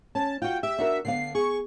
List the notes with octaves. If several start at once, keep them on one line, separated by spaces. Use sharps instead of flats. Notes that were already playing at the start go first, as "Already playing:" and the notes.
C#4 A5
F4 F#4 G5
G4 E5
D4 F#4 A#4
D3 B3 F5 C7
G#4 C#6